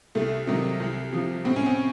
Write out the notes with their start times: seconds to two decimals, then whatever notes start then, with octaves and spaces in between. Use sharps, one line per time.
0.15 C2 A3
0.47 C3 D#3 F#3
0.80 C2
1.13 C3 F3
1.45 A2 C4
1.56 C#4
1.66 C4